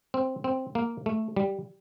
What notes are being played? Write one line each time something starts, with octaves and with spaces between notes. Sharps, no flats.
C4
C4
A#3
A3
G3